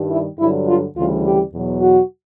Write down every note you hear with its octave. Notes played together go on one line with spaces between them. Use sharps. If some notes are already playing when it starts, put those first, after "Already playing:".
Already playing: G2 D#3 G3
E4
G2 D3 F#3 E4
F4
D2 C#3 E3 G3 F4
G4
E2 B2 F#3
F#4